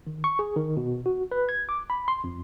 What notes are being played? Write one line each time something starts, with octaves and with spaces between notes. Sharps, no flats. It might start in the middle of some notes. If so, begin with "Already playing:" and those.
D#3
C#6
G#4
D#3
B2
F#4
B4
G#6
D6
B5
C6
F2